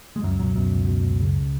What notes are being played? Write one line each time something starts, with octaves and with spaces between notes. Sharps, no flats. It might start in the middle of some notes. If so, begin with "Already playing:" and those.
G#3
C#2 F#2 F#3
F#2 B2 F#3
F#2 B2 F#3
C#2
B2
C#2
C#3